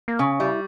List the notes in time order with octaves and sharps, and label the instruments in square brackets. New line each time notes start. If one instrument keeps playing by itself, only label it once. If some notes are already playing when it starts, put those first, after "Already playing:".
[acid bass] A#3
[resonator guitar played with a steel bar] C#3 [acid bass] C#4
[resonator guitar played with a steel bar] G3 [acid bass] E4